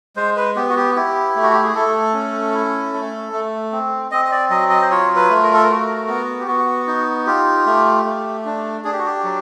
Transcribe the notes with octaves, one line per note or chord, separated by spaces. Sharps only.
G#3 C5
B4
B3 G4
F#4
G4
E4 G4
A3
F#4
G4
G#4
A3 A4
C#4
E4
A3
A3
C4
C4 D#5
D#5
D5
F#3 D#5
D#5
C5
F4 C#5
B4
A3
A#4
A4
A#4
F#4
B3
G4
B3 F#4
D#4
F4 G4
A3
A3
D4
D4 G#4
G4
F#4
G4
F#3